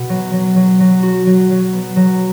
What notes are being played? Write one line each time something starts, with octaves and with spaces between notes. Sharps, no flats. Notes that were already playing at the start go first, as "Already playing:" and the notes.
Already playing: B2
F#3
F#3
F#3
F#3
F#4
F#3
F#3
B3
F#3